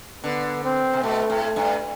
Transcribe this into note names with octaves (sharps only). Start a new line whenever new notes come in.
D3 B3
C4
C3
B2 A3
A2
A3
G2